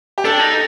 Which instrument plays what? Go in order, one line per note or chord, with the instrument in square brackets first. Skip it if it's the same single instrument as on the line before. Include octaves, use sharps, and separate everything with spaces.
[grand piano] G4
[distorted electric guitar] D4 [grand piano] A4
[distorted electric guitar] D#4